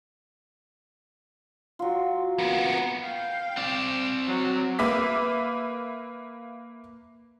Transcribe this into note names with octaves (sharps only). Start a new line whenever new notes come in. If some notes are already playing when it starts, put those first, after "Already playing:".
F#3 F4
A#3 B3
F5 G5
C4 D5
F#3 F#4
A#3 B4 E5 D6 B6